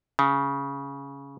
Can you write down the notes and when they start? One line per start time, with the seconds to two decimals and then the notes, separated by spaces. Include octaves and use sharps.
0.19 C#3